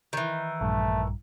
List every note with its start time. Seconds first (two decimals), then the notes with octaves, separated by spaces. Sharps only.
0.13 D#3 E3
0.61 A#1 G2 A3